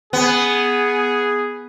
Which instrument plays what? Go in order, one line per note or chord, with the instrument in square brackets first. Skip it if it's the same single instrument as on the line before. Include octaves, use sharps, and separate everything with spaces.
[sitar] B3 [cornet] G#4